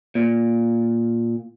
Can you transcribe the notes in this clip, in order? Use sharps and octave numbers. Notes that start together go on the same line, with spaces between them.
A#2